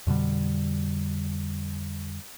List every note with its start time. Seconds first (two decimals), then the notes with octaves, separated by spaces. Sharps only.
0.07 F2 B2 D3 G3